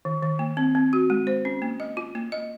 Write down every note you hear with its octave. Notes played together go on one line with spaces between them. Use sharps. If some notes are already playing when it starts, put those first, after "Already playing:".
D#3
D#3
A#3
C4
C4
F#4
G#3
C5
C#4
A#3
D#5
F4
A#3
D#5